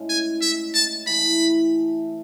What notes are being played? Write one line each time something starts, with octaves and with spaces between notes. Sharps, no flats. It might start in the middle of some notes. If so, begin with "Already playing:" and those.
Already playing: A2 G#3 C#4
G#5
E5
A5
E3 A3 E4 B5